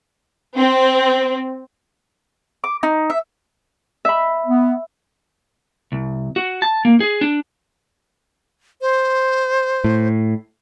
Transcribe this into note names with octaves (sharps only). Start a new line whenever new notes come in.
C4
D6
D#4
E5
E5 B5
B3
C2
F#4
A5
A#3
G#4
D4
C5
A2